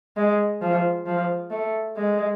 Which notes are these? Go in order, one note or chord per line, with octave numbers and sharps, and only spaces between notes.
G#3
F3
F3
A3
G#3